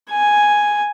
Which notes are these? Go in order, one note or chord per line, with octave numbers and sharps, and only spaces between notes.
G#5